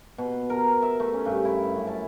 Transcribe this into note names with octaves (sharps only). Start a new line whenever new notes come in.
B2
A#4
E5
A3
C#4
G2
E4
F#2
A5